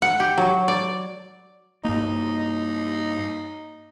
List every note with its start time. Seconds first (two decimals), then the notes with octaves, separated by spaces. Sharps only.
0.02 F#5
0.20 G4
0.38 F#3
0.68 D5
1.85 G2 A#3 D#4